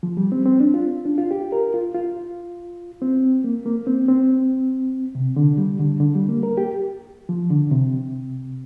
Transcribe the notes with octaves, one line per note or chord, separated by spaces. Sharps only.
F3
G3
C4
C4
D4
F4
D4
F4
G4
A#4
F4
F4
C4
A#3
A#3
C4
C4
C3
D3
G3
D3
D3
G3
A#3
A#4
G4
F3
D3
C3